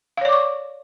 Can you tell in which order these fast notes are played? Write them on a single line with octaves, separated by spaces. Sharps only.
F5 C#5 D5 D6 C#6